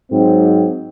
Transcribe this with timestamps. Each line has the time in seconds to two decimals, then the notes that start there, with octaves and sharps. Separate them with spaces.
0.11 G#2 F#3 C4